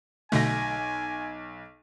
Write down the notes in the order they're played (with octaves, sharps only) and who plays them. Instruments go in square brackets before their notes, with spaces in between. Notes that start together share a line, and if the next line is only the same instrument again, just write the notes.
[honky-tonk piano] B1 A#6 [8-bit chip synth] B2 D3 A3 [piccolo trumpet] G#5